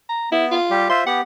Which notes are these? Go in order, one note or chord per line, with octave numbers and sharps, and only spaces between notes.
A#5
B3 E4
F4
G3 G4
F4 C5 E5 C6
B3 G4 F#5